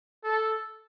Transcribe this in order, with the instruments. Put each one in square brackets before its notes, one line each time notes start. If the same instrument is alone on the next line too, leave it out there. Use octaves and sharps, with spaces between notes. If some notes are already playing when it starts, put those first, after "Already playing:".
[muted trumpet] A4